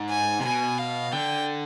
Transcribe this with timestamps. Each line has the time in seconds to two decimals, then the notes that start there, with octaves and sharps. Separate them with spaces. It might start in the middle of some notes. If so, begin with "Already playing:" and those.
Already playing: G#2
0.10 G#5
0.40 C3
0.45 B2 G#5
0.79 F5
1.13 D3 G5